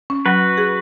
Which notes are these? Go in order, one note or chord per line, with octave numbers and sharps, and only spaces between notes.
C#4
F#3 F#4 B4
F#3
G#4